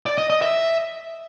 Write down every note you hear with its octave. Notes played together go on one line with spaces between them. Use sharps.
D5
D#5
D#5
E5